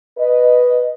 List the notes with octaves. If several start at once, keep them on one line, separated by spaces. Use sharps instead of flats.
B4 D#5